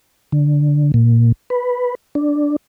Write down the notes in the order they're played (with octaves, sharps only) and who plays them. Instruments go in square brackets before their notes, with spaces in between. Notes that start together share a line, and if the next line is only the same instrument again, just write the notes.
[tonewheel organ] D3
A#2
B4
D4